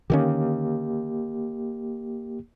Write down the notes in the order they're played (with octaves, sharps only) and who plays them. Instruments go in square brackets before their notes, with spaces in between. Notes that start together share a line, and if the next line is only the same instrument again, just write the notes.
[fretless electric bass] D3 D#3 C#4 [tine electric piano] A#3 G4